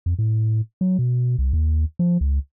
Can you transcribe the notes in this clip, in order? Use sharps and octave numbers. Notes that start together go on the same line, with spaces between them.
F2
A2
F#3
B2
C2
D#2
F3
C#2